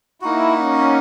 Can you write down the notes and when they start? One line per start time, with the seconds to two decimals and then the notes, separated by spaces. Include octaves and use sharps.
0.21 A#3 D#4 E4 F#4
0.57 C#4